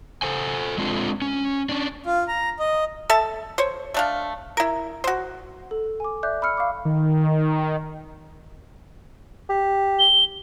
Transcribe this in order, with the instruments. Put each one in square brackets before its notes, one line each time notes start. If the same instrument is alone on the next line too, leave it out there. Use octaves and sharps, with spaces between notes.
[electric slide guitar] A4 C5 G#5
G#3 C4 D4 F4 G4 A4
C#4
C#4 D4
[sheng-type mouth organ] F4
A#5
D#5
[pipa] A4 E5 A5
C5 C#5
A3 D4 F5
E4 A#4
F#4 C5
[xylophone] A4
G#5 D6
D5 E5 D6 F#6 G6
B5 E6 F6 C#7
F5 C#6 D6
[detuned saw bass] D#3
[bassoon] G4
[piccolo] G7